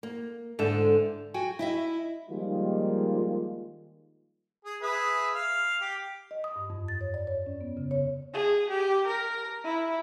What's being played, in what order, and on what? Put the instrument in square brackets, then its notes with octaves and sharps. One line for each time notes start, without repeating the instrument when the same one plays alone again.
[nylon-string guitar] A#3
G#2 D3 A4 E5
[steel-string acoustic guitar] F#4 G5 G#5
E4 D#5 E5
[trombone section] D#3 F3 G3 G#3 A#3 F4
[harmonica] G#4
G#4 B4 E5
F5
G4
[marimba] D#5
D#6
G2
F2
A6
C#5
D5
C#5
C#4
B3
C#3
C#5
[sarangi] G#4
G4
A#4
E4